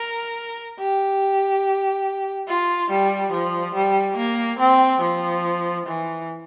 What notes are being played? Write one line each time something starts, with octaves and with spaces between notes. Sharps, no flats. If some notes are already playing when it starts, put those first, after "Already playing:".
Already playing: A#4
G4
F4
G3
F3
G3
A#3
C4
F3
E3